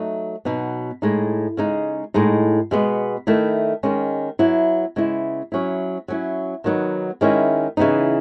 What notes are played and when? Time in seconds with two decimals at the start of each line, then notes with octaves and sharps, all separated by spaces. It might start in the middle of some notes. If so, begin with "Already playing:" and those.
Already playing: F#3 A3 D#4
0.45 B2 F#3 B3 D#4
1.02 A2 G#3 D#4
1.57 C#3 G#3 D#4
2.14 A2 G#3 D#4
2.71 B2 G#3 B3
3.27 D#3 A3 E4
3.83 D#3 G#3 C#4
4.39 F#3 B3 E4
4.96 C#3 G#3 B3 E4
5.52 F#3 C#4 E4
6.08 F#3 C#4 E4
6.64 D#3 F#3 B3 D#4
7.21 D#3 G#3 C#4 E4
7.77 C#3 E3 B3 D#4